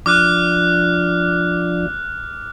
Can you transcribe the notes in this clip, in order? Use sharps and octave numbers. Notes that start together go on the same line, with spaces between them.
F3 D4 D6 F6 F#6